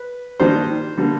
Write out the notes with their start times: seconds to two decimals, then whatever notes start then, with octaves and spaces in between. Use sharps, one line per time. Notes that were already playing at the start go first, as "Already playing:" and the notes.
Already playing: B4
0.40 D#3 G3 A#3 D4 C5
0.97 D3 G3 A#3